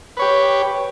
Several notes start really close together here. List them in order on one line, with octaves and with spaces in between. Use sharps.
B4 C#5 G4